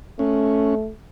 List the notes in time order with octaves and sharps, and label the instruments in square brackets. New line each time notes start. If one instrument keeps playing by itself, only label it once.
[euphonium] A3 [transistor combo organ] C#4